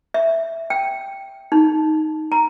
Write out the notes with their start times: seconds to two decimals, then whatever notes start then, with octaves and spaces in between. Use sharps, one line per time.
0.14 E5
0.70 G5
1.52 D#4
2.32 A#5